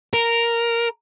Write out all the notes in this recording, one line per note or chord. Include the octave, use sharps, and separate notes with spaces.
A#4